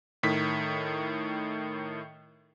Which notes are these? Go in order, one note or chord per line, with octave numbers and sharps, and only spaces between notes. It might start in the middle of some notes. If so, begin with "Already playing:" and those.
A2 D#3 B6